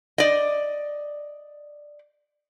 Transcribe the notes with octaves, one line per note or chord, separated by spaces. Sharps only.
D5 D#5